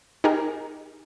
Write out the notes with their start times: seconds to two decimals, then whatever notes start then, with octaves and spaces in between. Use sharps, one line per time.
0.24 D#4 G4 G#4 A#4